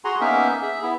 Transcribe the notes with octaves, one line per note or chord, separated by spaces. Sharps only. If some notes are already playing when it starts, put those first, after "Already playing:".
F#4 G#4 F#5 G#5 A#5 C6
A#3 B3 C#4 D#4 A#4 E5
G#4 E5
B3 E4